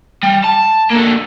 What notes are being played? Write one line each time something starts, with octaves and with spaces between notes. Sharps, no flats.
G3
A5
D3 A#3